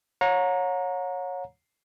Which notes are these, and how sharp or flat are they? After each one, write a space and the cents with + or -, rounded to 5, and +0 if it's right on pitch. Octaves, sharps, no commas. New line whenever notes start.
C#5 -5 F#5 -40 A#5 +0